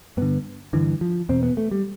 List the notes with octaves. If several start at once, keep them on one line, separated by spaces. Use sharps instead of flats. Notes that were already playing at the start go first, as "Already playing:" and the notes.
G2 D3 B3
G2 D3 E3
F3
E2 B2 C4
B3
A3
G3